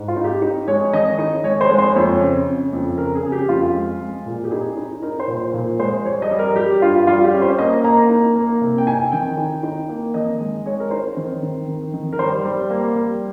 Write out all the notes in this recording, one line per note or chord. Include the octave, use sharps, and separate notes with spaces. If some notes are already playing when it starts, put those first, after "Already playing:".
Already playing: G#2
F4
D#4
G4
D#4
G#3 C#5
D#3 D#5
D#4
G#3 C#5
C5
G#3
C5
F2 C#5
C#3
C#3
F2
C#3 A#4
G#4
C#3
G4
F2 F4
G#3
G#3
A#2
G4
D#4 G#4
D#4
D#4 A#4
C5
A#2
C5
A#2
G#3 C5
G3 C#5
D#5
G3
A#4
G3 G4
G2 F4
G3 F4
G4
C#4
C5
A#3 D#5
A#3 A#5
D#4
A#3
C3
G5
D#4 G#5
D#3 G5
D#4
D#4
A#3
D#3 D#5
G#3
G#3 C#5
A#4
D#4 C5
D#3
D#3
D#3
D#3
A#4
G3 C5
G3
A#3
G3